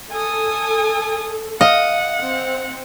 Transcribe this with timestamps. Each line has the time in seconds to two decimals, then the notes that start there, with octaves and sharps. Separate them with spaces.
0.12 A4 G#5 D#6
1.61 D#5 F5 F#5
2.21 C4